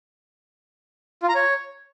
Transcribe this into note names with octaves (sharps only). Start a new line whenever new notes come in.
F4
A#5
C#5